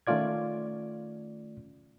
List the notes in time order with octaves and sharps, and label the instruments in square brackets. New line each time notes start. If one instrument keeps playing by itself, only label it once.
[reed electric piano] D#3 A3 C#4 F4 D5 G#6